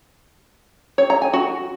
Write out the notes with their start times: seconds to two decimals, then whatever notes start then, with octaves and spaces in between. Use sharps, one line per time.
0.98 C#5
1.10 A#5
1.22 G#5
1.33 F#4